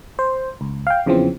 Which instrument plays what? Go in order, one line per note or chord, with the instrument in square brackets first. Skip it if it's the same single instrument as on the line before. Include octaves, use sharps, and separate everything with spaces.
[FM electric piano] C5
C#2
F5 G5
E2 C#3 E3 F3 C4